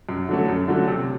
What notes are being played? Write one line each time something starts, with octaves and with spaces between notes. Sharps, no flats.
F#2
D3 F#3 A3
F#2
D3 F#3 A3
C3